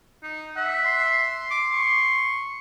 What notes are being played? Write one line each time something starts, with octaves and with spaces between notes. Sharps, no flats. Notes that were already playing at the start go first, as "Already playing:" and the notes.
D#4
E5 F#5
C6
D6
C#6